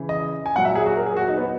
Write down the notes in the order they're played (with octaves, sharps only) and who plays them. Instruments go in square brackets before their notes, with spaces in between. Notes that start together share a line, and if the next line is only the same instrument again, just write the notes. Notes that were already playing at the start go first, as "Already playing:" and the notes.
Already playing: [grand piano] C#3 E3
D#5
G#5
A#2 F#3 F#5
E5
G#4
F#4
A#4
G#4
F#4
D#4
B3